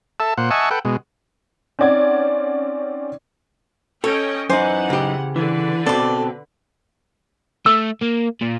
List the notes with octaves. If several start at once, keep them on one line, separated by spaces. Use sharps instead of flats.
A4 E5 A5
A#2 C5 F#5
D#5 E5 F#5 G#5 A5 C#6
A4 B4 F#5 G5
B2 G#3
C4 C#4 D#4 D5 F#5 G#6
C#4 A4 C#5 D#5 G5
F#2 E3 D#4 C5 F#5 G#5 D6
C#3 G4
D3 E3 B4
B2 C4 A4 D5 D6
A3 E6
A#3
A#2